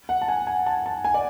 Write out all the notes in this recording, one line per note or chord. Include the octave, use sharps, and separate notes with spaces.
F#5
A5
G#5
G#5
A5
A5
G#5
D5